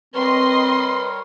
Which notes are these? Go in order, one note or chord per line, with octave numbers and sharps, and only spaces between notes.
G3 C4 A#4 B4 C#5 D#5 C6